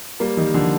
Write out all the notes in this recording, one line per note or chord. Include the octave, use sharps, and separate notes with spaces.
G3 A#3
D#3 G3
D3 F3